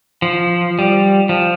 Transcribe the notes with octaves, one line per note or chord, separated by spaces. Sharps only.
F3
G3
F3